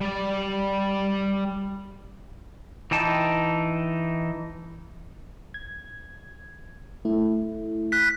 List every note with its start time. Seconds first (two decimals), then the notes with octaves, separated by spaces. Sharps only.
0.01 G3 D5
2.91 E3 D#4 G5 A5
5.54 G#6
7.05 A3 E4
7.92 F#6 B6